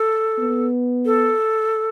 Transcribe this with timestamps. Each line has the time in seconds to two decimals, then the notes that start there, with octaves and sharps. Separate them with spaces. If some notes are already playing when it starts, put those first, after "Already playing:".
Already playing: A4
0.39 B3
1.05 A4